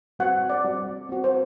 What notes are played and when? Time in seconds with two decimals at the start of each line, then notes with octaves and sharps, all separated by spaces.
0.19 G3 C4 F#4 F#5
0.50 D5
0.64 G3 C4 F#4
1.09 C4 F#4
1.24 C5